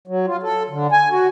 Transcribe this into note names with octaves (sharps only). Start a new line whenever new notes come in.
F#3
F4
A4
D3
G#5
F#4